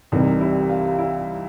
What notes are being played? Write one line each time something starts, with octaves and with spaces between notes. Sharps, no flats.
C2 C3 E3 G3 D#4
E4
F4
E4